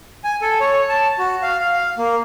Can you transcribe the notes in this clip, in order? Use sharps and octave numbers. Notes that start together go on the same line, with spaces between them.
G#5
A4
C#5
A5
F#4
F5
F5
A#3